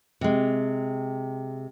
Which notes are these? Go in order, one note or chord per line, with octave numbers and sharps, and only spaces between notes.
C3 G#3